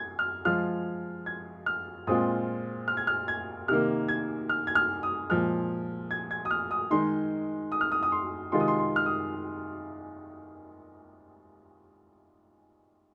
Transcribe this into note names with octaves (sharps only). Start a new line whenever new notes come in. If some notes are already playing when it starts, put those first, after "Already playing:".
Already playing: G#6
F6
F3 G#3 F4 F6
G#6
F6
A#2 G#3 C4 F4 D#6
F6
G#6
F6
G#6
C3 D#3 A#3 F6
G#6
F6
G#6
F6
D#6
A#2 F3 G#3 F6
G#6
G#6
D#6
F6
D#6
D#3 G#3 D#4 C6
D#6
F6
D#6
D#6
C6
C3 D#3 G#3 F4 C6
D#6
C6
C6
F6
D#6